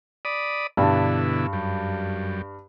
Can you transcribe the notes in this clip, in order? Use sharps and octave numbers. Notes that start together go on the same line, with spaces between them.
D5 B5 D#6
G2 B2 D3 E4 A5
F#2 G3